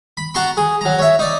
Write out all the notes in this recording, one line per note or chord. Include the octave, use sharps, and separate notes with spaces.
B5
F#4 A5 A#5 C6 C#6
G#4
F#3 A#5
C#5 E5
D#4 D5